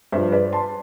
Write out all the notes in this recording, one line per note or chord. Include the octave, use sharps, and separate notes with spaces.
G2 F3 C5 E5
B4 D5
A5 C6